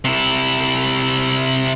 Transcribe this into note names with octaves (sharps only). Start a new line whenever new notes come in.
C3 E4